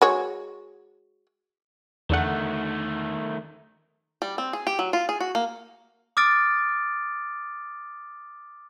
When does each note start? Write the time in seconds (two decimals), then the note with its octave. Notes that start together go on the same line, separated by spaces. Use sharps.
0.02 G#3 F#4 C#5
2.10 E2 D3 D#3 A3 F#5
4.22 G3
4.38 C4
4.53 G#4
4.67 G4
4.79 F#3
4.93 F4
5.09 G#4
5.21 F#4
5.35 A#3
6.17 D6 D#6 F6 A6 D7